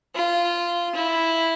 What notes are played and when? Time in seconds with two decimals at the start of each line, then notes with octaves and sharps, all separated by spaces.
0.15 F4
0.95 E4